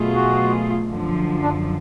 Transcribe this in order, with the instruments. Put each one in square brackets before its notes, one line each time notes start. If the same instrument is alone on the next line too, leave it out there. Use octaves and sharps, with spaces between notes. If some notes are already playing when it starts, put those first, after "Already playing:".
Already playing: [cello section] B2 F#3 A3 F4 G#4
[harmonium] F#4
[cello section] F#2 D3 F3
[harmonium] D4